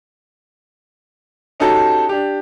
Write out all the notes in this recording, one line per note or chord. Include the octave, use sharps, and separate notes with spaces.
C#4 D#4 F#4 G4 A4 A5
D4 G4